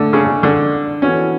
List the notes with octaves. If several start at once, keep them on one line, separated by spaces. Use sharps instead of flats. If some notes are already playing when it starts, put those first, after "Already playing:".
Already playing: D3 A3
C#3
D3
E3 B3 C#4 F#4 A4